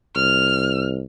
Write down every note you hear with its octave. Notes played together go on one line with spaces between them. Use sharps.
C2 F6